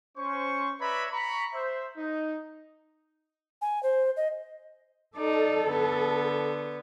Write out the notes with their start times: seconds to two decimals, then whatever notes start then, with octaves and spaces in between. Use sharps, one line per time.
0.18 C#4 C5 C#6
0.80 B4 C#5 D5 E5 A#5 B5
1.12 A#5 B5 C#6
1.54 C5 E5
1.98 D#4
3.62 G#5
3.83 C5
4.17 D#5
5.16 D#4 A4 D5
5.69 D3 B3